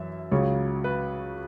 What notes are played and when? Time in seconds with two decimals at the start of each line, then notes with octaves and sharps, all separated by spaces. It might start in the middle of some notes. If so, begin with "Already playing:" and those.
Already playing: F#2 E3 E5
0.32 C#2 C#3 F#3 C#5
0.84 B4